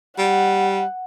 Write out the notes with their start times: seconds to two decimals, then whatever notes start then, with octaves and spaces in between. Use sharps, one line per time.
0.18 G3 F#5